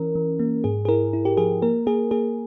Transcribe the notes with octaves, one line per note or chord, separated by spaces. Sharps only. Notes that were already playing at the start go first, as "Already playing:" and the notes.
Already playing: E3 C#4 A#4
E3
A#3
G#2 G#4
G#4
E4 A#4
E4
G4
F3 G#4
A#3 A#4
A#3 G#4
A#3 G#4